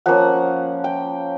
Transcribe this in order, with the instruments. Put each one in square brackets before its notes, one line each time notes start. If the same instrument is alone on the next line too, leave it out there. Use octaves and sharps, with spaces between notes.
[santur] F3 A#3 C#4 F#5
G5